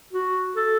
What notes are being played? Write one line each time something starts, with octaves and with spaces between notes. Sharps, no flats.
F#4
A4